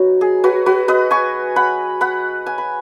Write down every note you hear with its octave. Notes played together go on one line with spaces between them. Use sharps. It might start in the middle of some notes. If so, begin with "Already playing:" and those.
Already playing: F#3 B3 D#4 F#4
G#4
F#4 B4
F#4 B4
B4 D#5
G#5 C#6
F#5 B5
F#5 B5
G#5
B5